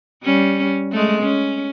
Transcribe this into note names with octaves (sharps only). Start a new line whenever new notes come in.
G3 C#4
G#3 A3
C#4